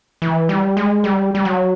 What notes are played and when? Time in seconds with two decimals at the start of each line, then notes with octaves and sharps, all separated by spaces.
0.22 E3
0.49 G3
0.77 G#3
1.04 G3
1.35 G3
1.45 F#3